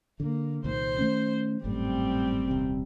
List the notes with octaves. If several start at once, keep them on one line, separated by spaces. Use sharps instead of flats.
D3 A#3
C2 A#2 D#3 C5
D#3 A3 C#4
G#1 F#2 A2 G3 C4
D#1 C2 C3